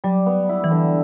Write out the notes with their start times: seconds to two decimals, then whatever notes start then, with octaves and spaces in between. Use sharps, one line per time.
0.04 F#3 G3
0.26 B3
0.49 E4
0.64 E3
0.71 D3